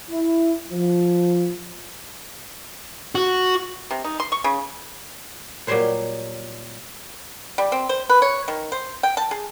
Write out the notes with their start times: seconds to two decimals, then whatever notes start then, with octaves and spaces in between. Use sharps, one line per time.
0.11 E4
0.70 F3
3.15 F#4
3.91 C3
4.04 D#4
4.20 C6
4.32 C#6
4.44 C#3
5.67 A#2 F#3 G3 G4 C5 C#5
7.58 G3
7.72 C4
7.89 C5
8.10 B4
8.22 C#5
8.48 D#3
8.72 C5
9.03 G5
9.17 A5
9.31 G#4